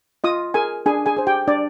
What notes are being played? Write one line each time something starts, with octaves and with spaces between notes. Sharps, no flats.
F4 D#5 D#6
G#4 A#4 G#5
D4 G#4 G#5
G#4 G#5
G#4 C5
G4 G5
D4 D5